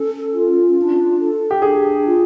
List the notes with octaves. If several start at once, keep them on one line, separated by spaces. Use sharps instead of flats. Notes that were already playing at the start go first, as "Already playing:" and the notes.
Already playing: C#4 A4
F4
D4
A4
G4
D4 G#4
F4